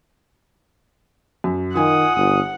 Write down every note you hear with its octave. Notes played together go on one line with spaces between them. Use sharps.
F#2
D#3 F4 F#5 G#5 D#6
G1 D#6